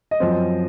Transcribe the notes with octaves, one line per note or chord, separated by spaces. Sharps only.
D#5
F#2 F3 C4